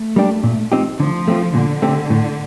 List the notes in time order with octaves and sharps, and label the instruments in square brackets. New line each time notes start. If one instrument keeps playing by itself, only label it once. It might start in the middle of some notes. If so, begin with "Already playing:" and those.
Already playing: [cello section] A3
[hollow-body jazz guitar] G3 A#3 D4 G4
A#2
F3 C4 D#4 G4
[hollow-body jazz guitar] D3 [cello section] F3
[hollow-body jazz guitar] A3 C4 F4
[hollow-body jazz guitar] A#2 [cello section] D3
[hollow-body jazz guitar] A3 C4 G4
A2